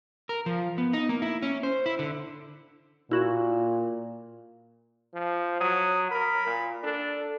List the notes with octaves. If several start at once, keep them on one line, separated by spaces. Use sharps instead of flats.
A#4
F3
B3
D#4
A#3
E4
C#4
C5
E4
D3
A#2 E4 F#4
F3
F#3 D#6
A#4 B5
A#2
D4 A4